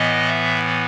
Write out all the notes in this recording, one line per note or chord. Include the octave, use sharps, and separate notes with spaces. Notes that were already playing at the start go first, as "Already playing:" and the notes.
Already playing: A2 E3 B3 D#5
E5